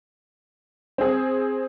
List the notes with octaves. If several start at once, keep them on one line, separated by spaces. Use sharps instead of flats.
C4 G#4